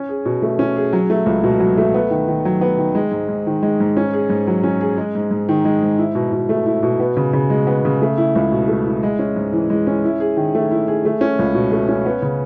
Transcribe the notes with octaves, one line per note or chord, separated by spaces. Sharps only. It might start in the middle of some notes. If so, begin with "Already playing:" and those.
Already playing: C#4
G#4
B2
A3
C#4
G#4
F#3
A3
C#2
B2
F#3
A3
B3
D#3
D#3
F#3
B3
D#3
G#3
G#2
G#2
D#3
G#3
G#2
C#4
G#4
G#2
F#3
C#4
G#4
G#3
G#2
G#2
D#3
G#3
G#2
E4
B2
B2
A3
E4
B2
B3
C#3
C#3
G#3
B3
C#3
A3
E4
C#2
B2
A3
E4
G#3
C#4
G#2
E3
G#3
C#4
E4
G#4
D#3
A3
E4
G#4
A3
C#4
C#2
B2
A3
C#4
B3
C#3